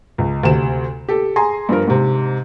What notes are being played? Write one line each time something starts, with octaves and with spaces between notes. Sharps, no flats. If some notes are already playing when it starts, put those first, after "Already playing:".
C#2
D2 C3 E7
G4 A4
G#4 G#5 A#5 C6
G2 F3 A#4
G#2 C3